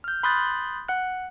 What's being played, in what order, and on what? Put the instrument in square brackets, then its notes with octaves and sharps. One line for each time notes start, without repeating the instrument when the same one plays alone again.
[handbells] F6 G6
B5 C6 D#6 F#6 G6 A6
F#5 F#6